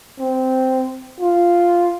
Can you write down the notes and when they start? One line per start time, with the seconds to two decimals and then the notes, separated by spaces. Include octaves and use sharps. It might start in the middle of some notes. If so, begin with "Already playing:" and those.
0.19 C4
1.20 F4